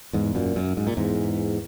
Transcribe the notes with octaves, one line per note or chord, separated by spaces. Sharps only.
E2 G#2
F#2 A#2
F#2
G#2
A#2
E2 G#2